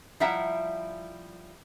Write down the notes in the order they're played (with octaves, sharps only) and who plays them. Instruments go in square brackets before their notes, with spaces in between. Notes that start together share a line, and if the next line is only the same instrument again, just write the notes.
[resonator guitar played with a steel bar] F3 G3 E4 E5 F#5 A#5